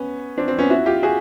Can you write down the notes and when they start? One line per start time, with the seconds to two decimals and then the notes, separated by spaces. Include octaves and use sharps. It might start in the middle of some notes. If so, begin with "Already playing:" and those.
Already playing: B3 C#4
0.38 C4 D4
0.48 C4
0.59 B3 C#4
0.70 E4 F#4
0.86 F4 G4
1.03 F#4 G#4